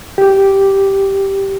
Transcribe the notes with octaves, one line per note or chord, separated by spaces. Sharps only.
G4